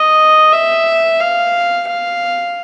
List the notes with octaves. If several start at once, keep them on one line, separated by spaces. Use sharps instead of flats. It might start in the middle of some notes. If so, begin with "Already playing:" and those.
Already playing: D#5
E5
F5
F5